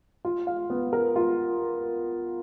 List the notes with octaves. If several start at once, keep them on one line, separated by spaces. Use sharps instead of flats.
F4
F5
B3
A#4
F4